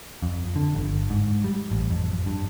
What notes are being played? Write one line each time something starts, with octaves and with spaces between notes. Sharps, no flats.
F2
D3
G1
G#2
G3
A1
F2
G2